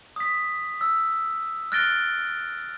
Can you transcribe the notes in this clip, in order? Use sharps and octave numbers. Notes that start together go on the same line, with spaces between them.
D#6 B6
E6
F6 F#6 A6 A#6 D7 G7